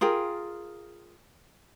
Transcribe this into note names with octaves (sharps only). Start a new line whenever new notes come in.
F4 G#4 A#4 G5